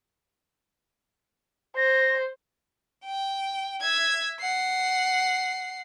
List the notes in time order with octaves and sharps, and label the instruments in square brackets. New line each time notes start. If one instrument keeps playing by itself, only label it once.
[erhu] C5 [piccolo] A#6
[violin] G5
E5 G#6
F#5 C7